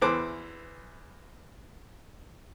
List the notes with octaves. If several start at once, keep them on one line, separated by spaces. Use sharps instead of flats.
E2 E3 C5 D6 F#6